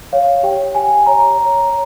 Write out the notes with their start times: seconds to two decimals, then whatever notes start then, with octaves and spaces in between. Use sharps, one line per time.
0.13 C#5 F5
0.43 G4 G5
0.75 G4 G#5
1.06 C#5 A#5
1.38 C#5
1.70 C#5